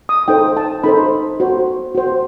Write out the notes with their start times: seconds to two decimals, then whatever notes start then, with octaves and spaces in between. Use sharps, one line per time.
0.09 D#6
0.28 D#4 A4 C5 G5
0.57 A5
0.84 D#4 A4 C5 B5
1.40 F#4 C5
1.95 F#4 C5